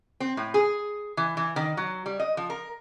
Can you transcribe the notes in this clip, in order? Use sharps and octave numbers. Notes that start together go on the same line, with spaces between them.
C4
A2
G#4
E3
E3
D#3
F#3
G3
D#5
F3
A#4